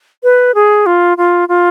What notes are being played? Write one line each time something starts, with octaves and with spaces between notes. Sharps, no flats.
B4
G#4
F4
F4
F4